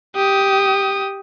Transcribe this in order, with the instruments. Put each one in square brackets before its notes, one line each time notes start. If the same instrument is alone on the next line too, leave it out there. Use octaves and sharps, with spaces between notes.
[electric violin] G4 D#6